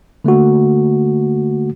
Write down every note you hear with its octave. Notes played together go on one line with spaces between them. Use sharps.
D3 A3 A#3 F#4